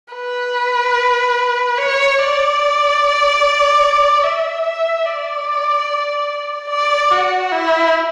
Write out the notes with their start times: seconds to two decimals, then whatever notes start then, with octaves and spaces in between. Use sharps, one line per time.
0.14 B4
1.77 C#5
2.18 D5
4.23 E5
4.65 E5
5.05 D5
6.70 D5
7.11 F#4
7.52 E4